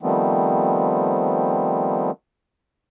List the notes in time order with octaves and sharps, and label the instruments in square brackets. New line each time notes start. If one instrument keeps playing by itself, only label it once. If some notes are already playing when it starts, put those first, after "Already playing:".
[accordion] D#3 F3 G3 A3 B3 C4